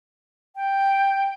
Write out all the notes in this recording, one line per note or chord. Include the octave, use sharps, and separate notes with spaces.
G5